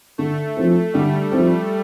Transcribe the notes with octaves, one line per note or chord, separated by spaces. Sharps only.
D3 A3
F3 C4
D3 G3
F3 C4